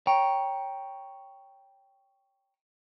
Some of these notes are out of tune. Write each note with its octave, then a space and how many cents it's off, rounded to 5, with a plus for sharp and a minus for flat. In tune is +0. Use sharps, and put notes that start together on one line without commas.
C#5 +0 G5 +0 A#5 +15